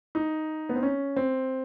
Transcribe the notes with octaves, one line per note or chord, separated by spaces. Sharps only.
D#4
B3
C4
C#4
C4